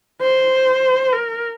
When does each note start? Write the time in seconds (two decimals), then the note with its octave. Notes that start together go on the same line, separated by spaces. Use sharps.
0.22 C5
1.13 A#4